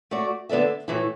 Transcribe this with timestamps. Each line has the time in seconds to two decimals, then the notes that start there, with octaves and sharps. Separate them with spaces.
0.11 A3 F#4 D5
0.49 D3 B3 D4 A4 E5
0.88 A2 E3 A3 E4